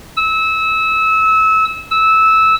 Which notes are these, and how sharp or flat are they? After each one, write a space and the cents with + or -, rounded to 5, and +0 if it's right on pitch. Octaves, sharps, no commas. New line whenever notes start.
E6 -25
E6 -15